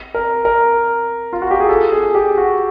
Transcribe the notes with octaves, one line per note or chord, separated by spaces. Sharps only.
A#4
A#4
F4
F#4
G4
G#4
A4
G#4
G4
F#4